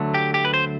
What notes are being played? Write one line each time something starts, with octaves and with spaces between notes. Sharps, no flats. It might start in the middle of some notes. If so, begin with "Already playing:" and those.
Already playing: D2 D3 F#3 A3
G4
G4
B4
C5